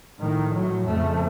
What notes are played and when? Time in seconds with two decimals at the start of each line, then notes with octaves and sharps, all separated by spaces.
0.19 A2 D#3
0.52 F#3
0.85 F2 C#3 A3